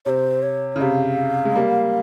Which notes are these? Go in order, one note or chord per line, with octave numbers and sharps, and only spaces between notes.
C3 C5 C#5
C#5
C#3
C3 F5
G#3
G3 A#3